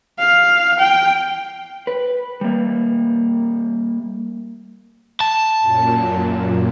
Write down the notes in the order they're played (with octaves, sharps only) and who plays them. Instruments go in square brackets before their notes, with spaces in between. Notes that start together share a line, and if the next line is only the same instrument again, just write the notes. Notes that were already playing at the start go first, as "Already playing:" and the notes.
[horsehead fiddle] F5
G5
[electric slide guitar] B4
G3 A#3
[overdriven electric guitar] A5
[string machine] F#2 A#2